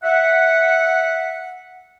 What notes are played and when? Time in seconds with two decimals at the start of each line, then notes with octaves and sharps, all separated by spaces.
0.03 E5 F#5